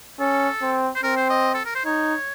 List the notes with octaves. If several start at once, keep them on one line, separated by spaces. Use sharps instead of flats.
C#4 A4
C4
C5
C4 A#4
C5
D#5
A4
A#4
C5
D#4 C#5